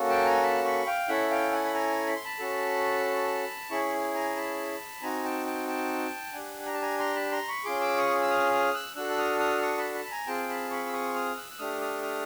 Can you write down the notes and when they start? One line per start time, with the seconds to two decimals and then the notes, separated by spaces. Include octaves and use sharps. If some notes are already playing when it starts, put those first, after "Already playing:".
Already playing: A#3 C#4 F#4 A4
0.10 G5 A5
0.26 G#5 A#5
0.43 A5 B5
0.64 B5 C#6
0.86 F5 G5
1.08 C#4 E4 A4 E5 F#5
1.30 F5 G5
1.52 F#5 G#5
1.65 B5
1.74 G#5 A#5
2.07 B5
2.16 C6
2.24 A5 B5
2.39 C#4 F#4 A4
3.71 C#4 E4 G#4 B5 C#6
4.15 G#5 A#5
4.36 A5 B5
5.02 C4 D#4 F#4 G#5 A#5
5.24 G5 A5
5.46 G5 A5
5.67 G5 A5
6.33 D4 G4 F#5 G#5
6.66 A#5
6.74 A5
6.82 G#5 A#5
6.99 A#5 C6
7.15 A5 B5
7.32 A#5 C6
7.48 B5 C#6
7.64 C#4 F4 G#4 C6 D6
7.81 D6 E6
7.97 C#6 D#6
8.22 E6
8.30 D#6 F6
8.52 D#6 F6
8.74 E6 F#6
8.96 D4 F#4 A4 E6 F#6
9.10 E6
9.18 D#6 F6
9.39 D#6 F6
9.62 C#6 D#6
9.77 A5 B5
9.95 A5 B5
10.05 B5
10.11 G#5 A#5
10.27 C4 F4 G#4 G5 A5
10.49 A5 B5
10.71 B5 C#6
10.86 E6
10.93 C#6 D#6
11.14 D#6 F6
11.37 E6 F#6
11.51 F#6
11.59 A3 D4 G4 D#6 F6
11.81 D#6 F6
12.02 D#6 F6